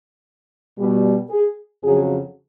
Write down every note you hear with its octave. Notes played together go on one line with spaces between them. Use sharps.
B2 G3
G#4
F2 C#3 F#3 G#4